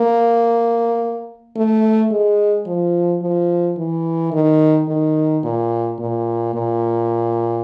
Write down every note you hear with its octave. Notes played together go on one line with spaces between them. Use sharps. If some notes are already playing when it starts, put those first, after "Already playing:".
Already playing: A#3
A3
G#3
F3
F3
E3
D#3
D#3
A#2
A#2
A#2